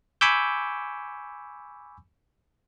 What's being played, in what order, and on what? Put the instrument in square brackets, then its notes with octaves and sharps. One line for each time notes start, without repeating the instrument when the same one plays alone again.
[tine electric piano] G#5 B5 C#6 D6 E6 G6